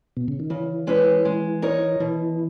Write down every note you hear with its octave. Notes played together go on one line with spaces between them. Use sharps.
B2
C#3
D#3
C#3 E3
G#3 C#4 G#4 B4
G#3
D#4 A#4 C#5
B2 E3